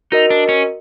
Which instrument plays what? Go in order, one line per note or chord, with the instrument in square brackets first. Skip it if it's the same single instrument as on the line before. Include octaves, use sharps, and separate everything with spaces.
[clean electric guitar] D#4 [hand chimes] F#4 A#4 D#5
[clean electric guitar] D4
C#4